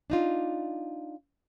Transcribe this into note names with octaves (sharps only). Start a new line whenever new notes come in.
D4 D#4 F4